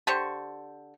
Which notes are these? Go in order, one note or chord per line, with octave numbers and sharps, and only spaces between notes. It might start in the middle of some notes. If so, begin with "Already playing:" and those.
D3 G4 C5 C#6